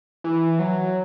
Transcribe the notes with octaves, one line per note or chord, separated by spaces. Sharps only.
E3
F#3